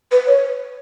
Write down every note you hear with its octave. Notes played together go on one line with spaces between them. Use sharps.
B4
C#5